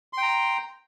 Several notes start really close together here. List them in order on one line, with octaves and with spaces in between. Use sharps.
C6 G5 A#5